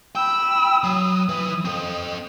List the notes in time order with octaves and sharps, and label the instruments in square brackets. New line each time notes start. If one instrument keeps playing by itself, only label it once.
[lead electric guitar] G5 [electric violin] B5 E6
[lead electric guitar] F#3 [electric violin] D#6
[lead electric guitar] E3 B4
C4 A4